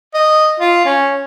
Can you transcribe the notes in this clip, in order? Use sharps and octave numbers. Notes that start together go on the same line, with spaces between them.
D#5
F4
C#4